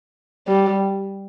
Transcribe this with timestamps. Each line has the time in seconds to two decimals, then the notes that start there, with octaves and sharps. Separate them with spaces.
0.47 G3